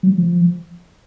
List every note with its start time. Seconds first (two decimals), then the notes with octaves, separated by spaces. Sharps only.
0.03 F#3
0.18 F3